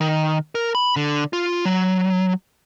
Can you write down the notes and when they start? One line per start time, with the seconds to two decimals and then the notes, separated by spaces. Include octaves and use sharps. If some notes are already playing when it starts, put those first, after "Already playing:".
0.01 D#3
0.55 A#4
0.75 B5
0.96 D3
1.33 F4
1.65 F#3